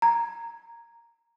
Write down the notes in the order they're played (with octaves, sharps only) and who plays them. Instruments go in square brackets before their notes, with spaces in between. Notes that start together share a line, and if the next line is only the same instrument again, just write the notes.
[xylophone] A#5 G#6